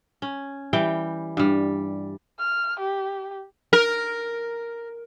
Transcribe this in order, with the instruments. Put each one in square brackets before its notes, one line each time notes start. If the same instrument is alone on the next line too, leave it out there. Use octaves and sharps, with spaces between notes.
[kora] C#4
E3 G3 G5
G2 G3
[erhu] F6
G4
[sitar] A#4